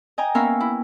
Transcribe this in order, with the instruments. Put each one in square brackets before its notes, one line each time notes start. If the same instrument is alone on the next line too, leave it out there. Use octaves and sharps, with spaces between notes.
[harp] D#5 G5 G#5 A#5
A#3 B3 C#4 A#4 E5 F5
E4